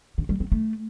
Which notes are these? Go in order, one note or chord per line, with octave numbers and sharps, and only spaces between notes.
D3
G3
C4
A3